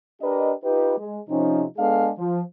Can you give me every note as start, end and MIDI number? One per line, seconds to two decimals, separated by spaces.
0.22 0.52 62
0.22 0.52 67
0.22 0.52 70
0.22 0.52 71
0.22 0.52 75
0.64 0.94 63
0.64 0.94 65
0.64 0.94 67
0.64 0.94 71
0.98 1.19 56
1.29 1.64 48
1.29 1.64 53
1.29 1.64 60
1.29 1.64 61
1.29 1.64 63
1.78 2.10 56
1.78 2.10 59
1.78 2.10 62
1.78 2.10 68
1.78 2.10 69
1.78 2.10 77
2.19 2.41 53